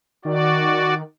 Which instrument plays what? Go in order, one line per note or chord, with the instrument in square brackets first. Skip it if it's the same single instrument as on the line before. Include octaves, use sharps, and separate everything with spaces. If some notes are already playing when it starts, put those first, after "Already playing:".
[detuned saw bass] D#3 [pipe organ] F#4 D5